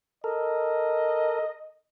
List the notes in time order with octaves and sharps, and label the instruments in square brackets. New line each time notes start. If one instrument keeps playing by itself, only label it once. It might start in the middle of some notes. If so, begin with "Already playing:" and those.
[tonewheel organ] A4 A#4 [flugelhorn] D#5